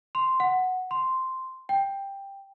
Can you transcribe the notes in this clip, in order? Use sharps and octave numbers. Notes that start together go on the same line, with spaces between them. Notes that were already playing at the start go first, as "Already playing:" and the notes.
C6
F#5
C6
G5